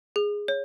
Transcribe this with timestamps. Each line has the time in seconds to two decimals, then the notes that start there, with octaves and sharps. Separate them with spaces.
0.16 G#4
0.48 C#5